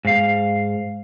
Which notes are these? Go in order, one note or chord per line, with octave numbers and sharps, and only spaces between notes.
G#2 F5